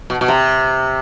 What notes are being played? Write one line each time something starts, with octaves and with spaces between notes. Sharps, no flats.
B2
B2
C3